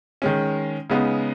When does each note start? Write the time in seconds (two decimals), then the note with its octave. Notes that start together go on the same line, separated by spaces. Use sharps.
0.22 D#3 G#3 C#4
0.90 C#3 G#3 B3 D#4